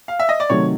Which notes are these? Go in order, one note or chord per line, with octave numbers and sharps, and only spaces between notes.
F5
E5
D#5
D5
C3 D#3 F#3 A3 C#5